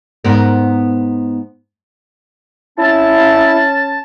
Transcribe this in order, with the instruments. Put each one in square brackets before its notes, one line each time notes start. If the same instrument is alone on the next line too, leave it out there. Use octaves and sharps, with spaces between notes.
[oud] G#2 B3 A#4
[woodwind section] C#4 A5 [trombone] E4